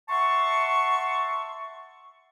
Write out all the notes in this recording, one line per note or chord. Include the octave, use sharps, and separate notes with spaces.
E5 F#5 A5 C6 C#6